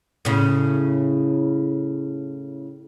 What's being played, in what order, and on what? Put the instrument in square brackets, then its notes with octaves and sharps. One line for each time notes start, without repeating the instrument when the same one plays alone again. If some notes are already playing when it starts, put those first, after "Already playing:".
[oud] A2 C#3